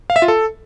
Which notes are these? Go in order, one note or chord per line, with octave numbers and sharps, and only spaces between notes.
F5
E5
F4
A4